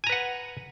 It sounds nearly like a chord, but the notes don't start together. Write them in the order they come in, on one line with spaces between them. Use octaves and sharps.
G#5 A#5 B4 F#5